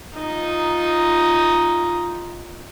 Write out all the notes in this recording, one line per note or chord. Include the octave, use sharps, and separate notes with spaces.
D#4 F4